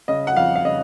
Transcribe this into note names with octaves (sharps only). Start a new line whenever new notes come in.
C#3 D#5
F#5
F2 F5
F5
C#3 D#5